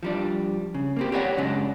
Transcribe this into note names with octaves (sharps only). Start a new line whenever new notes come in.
F3 G3 D4
C#3
A#3 C4 G4
G4 B4 C#5 D5 F5 F#5
F#2 C#3 F#3 G#3 D4